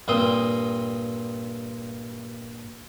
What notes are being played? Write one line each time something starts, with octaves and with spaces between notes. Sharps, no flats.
G2 A#2 C4 C6 D#6